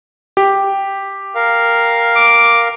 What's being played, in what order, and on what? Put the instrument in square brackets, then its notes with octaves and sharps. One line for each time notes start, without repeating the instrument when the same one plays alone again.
[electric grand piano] G4
[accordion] A#4 F5
[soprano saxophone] D6